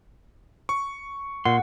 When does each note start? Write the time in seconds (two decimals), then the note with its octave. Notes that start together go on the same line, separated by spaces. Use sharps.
0.69 C#6
1.45 A#2 F#5 C6